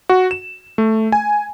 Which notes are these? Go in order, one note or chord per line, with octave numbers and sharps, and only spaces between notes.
F#4
E7
A3
G#5